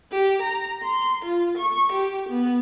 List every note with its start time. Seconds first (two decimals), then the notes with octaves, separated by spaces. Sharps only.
0.12 G4
0.42 A#5
0.83 C6
1.25 F4
1.57 C#6
1.92 G4
2.29 B3